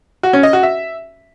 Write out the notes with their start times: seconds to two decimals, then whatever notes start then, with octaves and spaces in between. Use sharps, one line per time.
0.23 F#4
0.33 C#4
0.43 D#5
0.53 F#4
0.63 E5